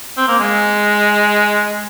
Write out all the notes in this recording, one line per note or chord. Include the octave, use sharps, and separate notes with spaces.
C4
A#3
G#3